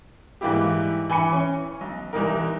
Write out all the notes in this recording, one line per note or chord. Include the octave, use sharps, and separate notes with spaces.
G#2 E3 G3 A#3 E4 G4
E3 G#5 B5 C#7
C#4
B1
C2 E3 D#4 A#4